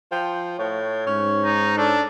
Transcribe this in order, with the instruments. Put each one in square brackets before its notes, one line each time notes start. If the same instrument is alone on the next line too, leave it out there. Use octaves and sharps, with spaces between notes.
[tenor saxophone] F3 [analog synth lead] G5
[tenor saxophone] A2 [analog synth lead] C#5
[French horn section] G#2 [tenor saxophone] C#4
[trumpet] D#4
[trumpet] D4 [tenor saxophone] A4